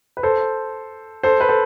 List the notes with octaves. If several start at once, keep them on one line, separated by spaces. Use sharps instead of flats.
B4
A4 C5
A4 C5
B4
A4 C5